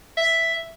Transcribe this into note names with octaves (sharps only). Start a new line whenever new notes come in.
E5